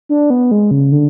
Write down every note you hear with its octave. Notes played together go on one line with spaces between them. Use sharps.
D4
B3
G#3
C#3
D3